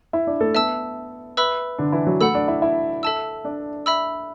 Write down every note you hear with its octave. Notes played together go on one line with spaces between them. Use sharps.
E4 E5
D4 D5
A3 A4
B3 E5 A5 E6
B4 E5 B5 E6
D3 D4
E3 E4
F#3 F#4
A3 A4 F#5 B5 E6
D4 D5
E4 E5
E4 E5
A4 E5 A5 E6
D4 D5
E5 B5 E6